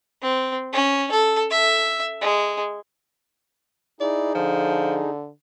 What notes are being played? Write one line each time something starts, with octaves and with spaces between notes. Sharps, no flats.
C4
C#4
A4
E5
G#3
D#4 E4 G#4 D5
D3 F3